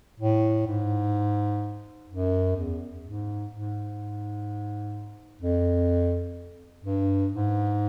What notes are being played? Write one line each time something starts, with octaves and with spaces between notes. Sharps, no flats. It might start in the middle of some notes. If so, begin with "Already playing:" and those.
A2
G#2
F#2
E2
G#2
G#2
F2
G2
G#2